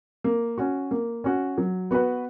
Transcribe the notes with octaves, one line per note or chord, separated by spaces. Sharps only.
A#3
C#4 F#4
A#3
C#4 F#4
F#3
B3 F#4 B4